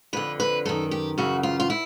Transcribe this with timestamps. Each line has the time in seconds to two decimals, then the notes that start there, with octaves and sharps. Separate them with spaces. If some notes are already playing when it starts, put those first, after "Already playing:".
0.13 F2 D3 B4
0.40 B4
0.65 F#2 D#3 A4
0.91 G4
1.18 F#2 C#3 E3 F#4
1.43 F4
1.60 F4
1.70 E4